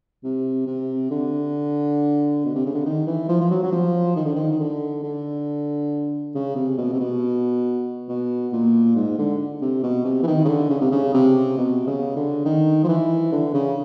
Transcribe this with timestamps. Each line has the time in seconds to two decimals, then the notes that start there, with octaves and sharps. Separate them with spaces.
0.24 C3
0.67 C3
1.10 D3
2.45 B2
2.55 C3
2.65 C#3
2.75 D3
2.85 D#3
3.07 E3
3.29 F3
3.41 F3
3.51 F#3
3.63 F#3
3.72 F3
4.16 D#3
4.26 D3
4.36 D#3
4.51 D#3
4.60 D3
5.03 D3
6.34 C#3
6.55 C3
6.78 B2
6.93 C3
7.00 B2
8.08 B2
8.53 A#2
8.96 G#2
9.18 D3
9.61 C3
9.83 B2
10.05 C3
10.23 E3
10.27 D#3
10.44 C#3
10.48 D3
10.70 C#3
10.81 C3
10.92 C#3
11.14 C3
11.57 B2
11.87 C#3
12.16 D3
12.45 D#3
12.84 F3
12.88 E3
13.32 D3
13.53 C#3